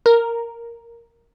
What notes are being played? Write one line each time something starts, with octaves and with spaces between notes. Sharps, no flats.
A#4